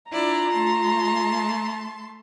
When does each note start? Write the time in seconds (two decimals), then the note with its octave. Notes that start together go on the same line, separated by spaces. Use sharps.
0.12 D4 E4 F4 D5 A#5
0.52 A3 A5 C6